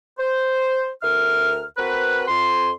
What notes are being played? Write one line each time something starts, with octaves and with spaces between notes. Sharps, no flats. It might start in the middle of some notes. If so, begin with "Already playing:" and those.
C5
D2 A#4 E5 F6
C4 F#4 A#4 B4
F2 C6